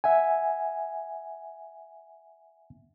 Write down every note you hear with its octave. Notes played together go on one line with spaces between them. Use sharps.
E5 F#5 G#5